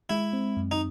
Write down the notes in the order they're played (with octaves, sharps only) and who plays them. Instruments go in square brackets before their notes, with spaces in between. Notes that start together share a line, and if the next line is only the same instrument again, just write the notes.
[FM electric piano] G#3 [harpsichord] E4
[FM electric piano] C4
F#2
[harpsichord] D#4